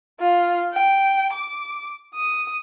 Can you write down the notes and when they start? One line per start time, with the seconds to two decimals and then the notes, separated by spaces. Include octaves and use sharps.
0.20 F4
0.73 G5
1.33 D6
2.15 D#6